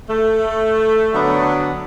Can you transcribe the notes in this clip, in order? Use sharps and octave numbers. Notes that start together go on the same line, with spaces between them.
A3
D3 F#3 B3 D4